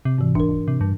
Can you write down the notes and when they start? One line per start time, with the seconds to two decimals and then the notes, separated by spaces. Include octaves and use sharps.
0.05 C3
0.18 G#2 E3
0.35 E1 D4 A#4
0.49 D#1
0.68 C3
0.81 G2